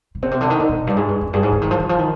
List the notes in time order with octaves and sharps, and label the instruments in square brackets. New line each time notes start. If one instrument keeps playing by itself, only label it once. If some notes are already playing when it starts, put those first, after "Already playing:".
[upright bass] C3
[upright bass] B2 [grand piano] C4
[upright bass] C3
D3
D#3
[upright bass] D3 [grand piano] D#4
[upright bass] B2
F2
G2
[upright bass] G#2 [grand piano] G#4
[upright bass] G2
F2
[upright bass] G2 [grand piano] G#4
[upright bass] G#2
D3
D#3
F3
D#3
F3
D#3